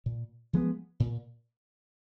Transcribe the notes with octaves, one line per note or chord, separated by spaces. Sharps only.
A#2
F3 G#3 B3
A#2